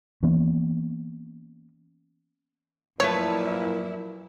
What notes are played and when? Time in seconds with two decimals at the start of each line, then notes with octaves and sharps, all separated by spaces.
0.23 E3 A#3 B3 C#4
3.00 F#2 A#2 F3 A3 E4 B4 C#5